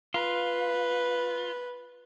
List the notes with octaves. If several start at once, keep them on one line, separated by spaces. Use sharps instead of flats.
F4 B4